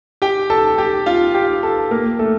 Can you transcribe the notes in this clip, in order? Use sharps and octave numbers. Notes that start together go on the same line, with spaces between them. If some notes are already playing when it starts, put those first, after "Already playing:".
G4 G5
A4 A5
G4 G5
F4 F5
G4 G5
A4 A5
A#3 A#4
A3 A4